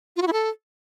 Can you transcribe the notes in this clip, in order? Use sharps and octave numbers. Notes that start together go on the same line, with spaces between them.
F4
F#4
E4
A4